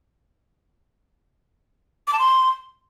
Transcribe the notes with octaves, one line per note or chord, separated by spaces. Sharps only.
D6
A5
C6